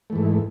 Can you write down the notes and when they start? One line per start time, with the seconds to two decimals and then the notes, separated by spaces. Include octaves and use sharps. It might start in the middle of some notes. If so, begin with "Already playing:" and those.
0.10 A3
0.13 E3
0.16 G#2